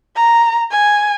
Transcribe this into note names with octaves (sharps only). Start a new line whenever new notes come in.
A#5
G#5